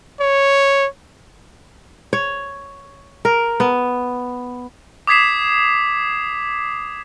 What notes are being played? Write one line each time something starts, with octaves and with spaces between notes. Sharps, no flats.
C#5
C#5
A#4
B3
D6 D#6 G#6 B6 C7 E7